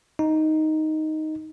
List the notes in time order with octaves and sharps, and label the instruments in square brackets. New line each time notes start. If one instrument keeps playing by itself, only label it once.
[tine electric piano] D#4